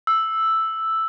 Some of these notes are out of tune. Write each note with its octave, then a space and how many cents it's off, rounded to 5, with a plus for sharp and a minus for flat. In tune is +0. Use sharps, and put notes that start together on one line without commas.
E6 +0